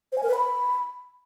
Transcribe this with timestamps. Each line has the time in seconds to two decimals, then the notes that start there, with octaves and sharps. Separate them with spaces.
0.12 C5
0.18 G#5
0.23 A#4
0.29 B4
0.34 B5